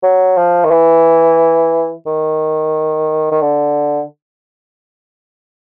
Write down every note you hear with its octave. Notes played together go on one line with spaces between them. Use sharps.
F#3
F3
D#3
E3
D#3
D#3
D3